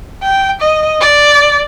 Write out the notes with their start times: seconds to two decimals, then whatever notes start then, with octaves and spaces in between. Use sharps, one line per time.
0.22 G5
0.61 D#5
1.01 D5